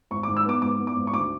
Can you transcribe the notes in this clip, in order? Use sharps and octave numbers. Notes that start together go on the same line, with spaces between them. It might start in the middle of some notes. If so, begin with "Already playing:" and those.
G#1 C#6
D6
G#2
E6
B3 D6
G#2 D6
B3
D6
G#1
C#6
D2 D6